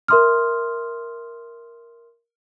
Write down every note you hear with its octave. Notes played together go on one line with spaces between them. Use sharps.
A#4 E5 C6 D#6 F6